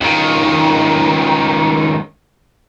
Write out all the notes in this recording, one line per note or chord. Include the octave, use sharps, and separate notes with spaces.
C#2 D#3